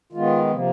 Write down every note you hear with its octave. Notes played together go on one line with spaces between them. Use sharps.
D#3 G#3 B3 F4
C3 F3 A#3